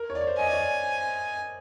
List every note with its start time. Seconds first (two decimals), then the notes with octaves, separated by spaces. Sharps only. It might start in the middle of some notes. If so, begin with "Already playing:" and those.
Already playing: A#4
0.10 C#5
0.15 D5
0.21 C#5
0.27 C5
0.38 D#5 G#5
0.46 D5
0.53 C#5
0.60 D5